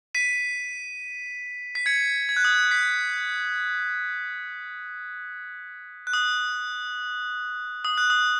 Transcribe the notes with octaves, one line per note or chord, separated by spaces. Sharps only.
B6 D#7
B6
G#6 C#7
G#6
F#6
D#6
F#6
B6
F#6
D#6
D#6
F#6
D#6